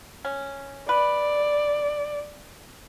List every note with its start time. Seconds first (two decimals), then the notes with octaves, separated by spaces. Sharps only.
0.25 C#4
0.89 B4 D5